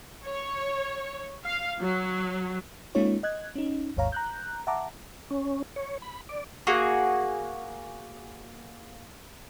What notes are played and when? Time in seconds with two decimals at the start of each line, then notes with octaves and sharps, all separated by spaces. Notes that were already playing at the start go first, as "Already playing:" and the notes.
0.25 C#5
1.45 F5
1.80 F#3
2.95 G#3 A#3 C#4 D#4 F4 C#5
3.23 D#5 F#6 G#6
3.55 C#4 D#4
3.96 G#1 D#2 G#2 C#5 F5 A#5
4.12 A#5 F#6 G6
4.67 E5 F#5 A5 A#5 D6
5.30 C#4
5.76 C#5
6.02 B5
6.29 D5
6.67 A#3 F#4 G#4